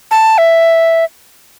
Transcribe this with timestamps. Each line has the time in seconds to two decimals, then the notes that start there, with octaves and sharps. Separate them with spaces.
0.11 A5
0.38 E5